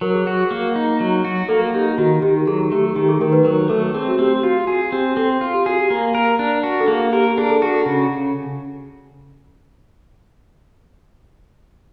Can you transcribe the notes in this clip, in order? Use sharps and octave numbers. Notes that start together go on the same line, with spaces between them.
F#3 A#4
G#4
F#4
G#4
A#3
D#4
F#3
F#4
A#3 A4
D#4 G4
D#3 F#4
D#3 G4
F#3 G#4
A3 G4
D#3 G4
G#4
D#3 A#4
B4
F#3 A#4
A3 A4
C4 G#4
F#4
C4 G4
F4 F#4
F#4 G#4
C4 G4
C4 A4
F4
G4
F#4 G#4
G4
A#3
A#4
D4
F#4
A4
A#3 G#4
G4 A#4
D4 G#4
A4
F#4 G#4
A4
C#3